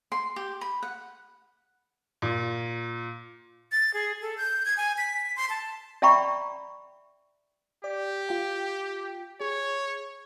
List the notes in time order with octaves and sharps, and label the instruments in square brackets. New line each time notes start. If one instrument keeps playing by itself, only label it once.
[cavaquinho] C6
G4
B5
F#5
[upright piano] A#2
[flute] A6
G#4
A4
G6
G#6
G#5
B6
C6
A5
[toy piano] D5 E5 G5 A#5 B5 C#6
[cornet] G4 [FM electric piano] D5
[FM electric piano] F4 G5
[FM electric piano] G#4 [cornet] C#5